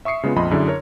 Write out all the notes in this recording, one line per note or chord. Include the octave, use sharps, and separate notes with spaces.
E5 C#6 D#6 C7 C#7
C#3 G#3 B3 F4
A#1 F2 D#5 B5 C6
F#2 D3 D4 E4 G#4
A#4 C#5